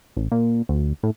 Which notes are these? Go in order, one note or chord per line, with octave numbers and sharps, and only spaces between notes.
A1
A#2
D2
A2